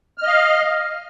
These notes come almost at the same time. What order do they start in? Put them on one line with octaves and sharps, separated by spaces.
F6 D#5 F5